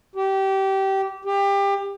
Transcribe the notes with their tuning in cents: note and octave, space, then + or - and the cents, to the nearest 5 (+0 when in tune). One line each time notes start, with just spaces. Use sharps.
G4 -20
G4 +25